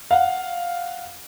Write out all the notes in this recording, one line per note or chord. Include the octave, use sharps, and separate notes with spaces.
F5 F#5